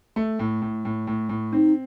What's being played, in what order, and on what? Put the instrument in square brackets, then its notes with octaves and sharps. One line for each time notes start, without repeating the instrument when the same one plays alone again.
[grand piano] A3
A2
A2
A2
A2
A2
[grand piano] C4 [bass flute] D#4